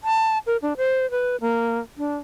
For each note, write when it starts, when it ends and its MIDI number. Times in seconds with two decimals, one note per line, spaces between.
0.04 0.38 81
0.47 0.57 70
0.62 0.73 62
0.77 1.10 72
1.11 1.36 71
1.41 1.79 58
1.97 2.16 62